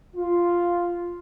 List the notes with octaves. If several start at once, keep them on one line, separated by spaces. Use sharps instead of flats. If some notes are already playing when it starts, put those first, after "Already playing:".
F4